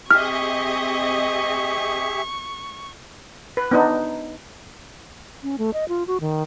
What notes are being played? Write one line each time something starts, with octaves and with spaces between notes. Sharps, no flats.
C4 G4 G#4 D#5 E5 C#6 F6
B4
B3 D4 D#4
C#4
A3
D#5
F4
F#4
D#3